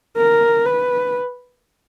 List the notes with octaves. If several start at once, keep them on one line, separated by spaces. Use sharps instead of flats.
A#4
B4